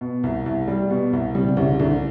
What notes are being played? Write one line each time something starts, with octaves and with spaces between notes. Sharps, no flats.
B2
C2
C2
G3
B2
C2
C3 G3
C3
C2 C#3
C2 D3